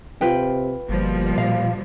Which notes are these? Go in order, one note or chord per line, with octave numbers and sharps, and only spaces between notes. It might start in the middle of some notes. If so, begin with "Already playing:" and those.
C3 F4 B4 G5
G1 B2 F3 G3 A#3
A#2 F5